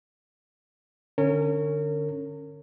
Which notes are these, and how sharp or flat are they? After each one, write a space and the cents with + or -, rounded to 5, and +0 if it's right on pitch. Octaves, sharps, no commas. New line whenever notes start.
D3 +15 C#4 +0 A#4 -40